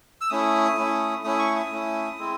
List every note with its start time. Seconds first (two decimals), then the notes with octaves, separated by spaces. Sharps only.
0.21 E6
0.30 A3 C#4 E4 D#6
0.77 A3 C#4 E4
1.24 A3 C#4 E4 D#6
1.39 C#6
1.56 D#6
1.72 A3 C#4 E4
2.18 G#3 C4 E4